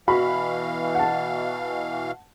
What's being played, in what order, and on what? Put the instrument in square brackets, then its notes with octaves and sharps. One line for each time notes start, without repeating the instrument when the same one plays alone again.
[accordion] B2 E3 F5 [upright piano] F#4 B5
[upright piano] F#5 A5